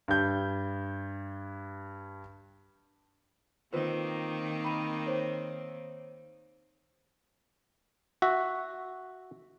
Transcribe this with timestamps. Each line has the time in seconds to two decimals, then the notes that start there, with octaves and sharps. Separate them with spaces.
0.08 G2 G6
3.73 D#3 A#3 C4 F4 B4 C5
4.65 B5 D#7
5.06 C5 C#5
8.22 F#4 E5